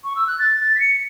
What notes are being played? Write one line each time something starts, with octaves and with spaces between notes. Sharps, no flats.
C#6
E6
F#6
A6
A6
B6
C#7